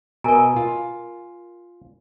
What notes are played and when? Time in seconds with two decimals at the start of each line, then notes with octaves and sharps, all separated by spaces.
0.24 B2 A#4 D#5 G#5 A#5
0.56 F4